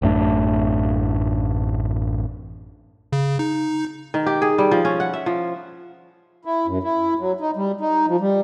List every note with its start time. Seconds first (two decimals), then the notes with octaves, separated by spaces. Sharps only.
0.02 A1 F#2 A3 D4
3.13 C#3
3.39 D#4
4.14 D#3
4.26 G4
4.42 G#4
4.58 G3
4.71 F3
4.85 C#4
5.00 F#5
5.14 E5
5.26 F3
6.45 E4
6.67 F#2
6.83 E4
7.19 F#3
7.40 D#4
7.56 G3
7.81 D#4
8.07 F3
8.20 G3